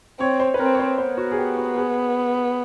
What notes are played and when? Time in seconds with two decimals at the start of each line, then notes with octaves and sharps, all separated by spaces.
0.20 C4 C#5
0.40 C5
0.54 B4
0.59 C4 A#4
0.75 C#5
0.79 C5
0.98 B3 C5
1.17 F#4
1.31 G#4
1.38 G4
1.57 F#4
1.77 G#4